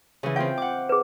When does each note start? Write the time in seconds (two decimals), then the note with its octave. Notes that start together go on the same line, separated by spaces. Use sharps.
0.23 C#3 E3
0.36 C4 F4 F5 G5
0.58 F#5 D6
0.89 G#4 B4